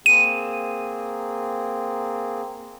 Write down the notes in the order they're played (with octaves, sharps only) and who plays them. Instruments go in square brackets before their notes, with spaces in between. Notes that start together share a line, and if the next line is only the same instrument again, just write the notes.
[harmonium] A#3 C4 G#4 [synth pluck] D#7